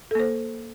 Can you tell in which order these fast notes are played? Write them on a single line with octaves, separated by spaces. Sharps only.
A4 A#3 C5